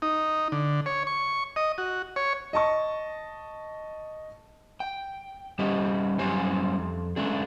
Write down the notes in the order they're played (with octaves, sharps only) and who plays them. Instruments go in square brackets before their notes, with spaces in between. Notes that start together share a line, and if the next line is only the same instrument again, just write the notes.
[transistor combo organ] D#4
D3
C#5
C#6
D#5
F#4
C#5
[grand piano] D#5 A5 C#6
[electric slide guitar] G5
G3 C#4 G4 C5 D#5
F#2 G3 C#4 C5 G#5
F2
G#3 A3 C#4 D4 G#4